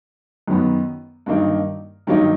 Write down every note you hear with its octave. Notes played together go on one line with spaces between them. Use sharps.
F#2 D#3 F#3 B3
G2 D#3 F#3 A#3 D#4
G2 D#3 F#3 A#3 D#4